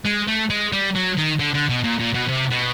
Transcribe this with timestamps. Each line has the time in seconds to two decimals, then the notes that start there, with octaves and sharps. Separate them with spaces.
0.06 G#3
0.28 A3
0.50 G#3
0.72 G3
0.95 F#3
1.17 D#3
1.39 D3
1.54 D3
1.69 B2
1.84 A#2
1.99 A#2
2.14 B2
2.28 C3
2.51 B2